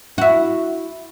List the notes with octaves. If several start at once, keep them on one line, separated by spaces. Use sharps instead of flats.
E4 F#4